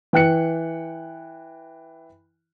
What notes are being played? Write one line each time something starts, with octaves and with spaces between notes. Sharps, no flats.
E3 G5 F#6 C#7